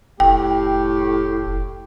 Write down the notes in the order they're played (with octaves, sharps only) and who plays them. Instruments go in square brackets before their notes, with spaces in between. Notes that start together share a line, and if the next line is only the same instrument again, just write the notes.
[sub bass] F1 [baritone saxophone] A2 [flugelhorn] G4 [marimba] G5